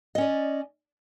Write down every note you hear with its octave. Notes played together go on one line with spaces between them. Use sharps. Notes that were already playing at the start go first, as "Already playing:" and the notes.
C#4 D5 D#5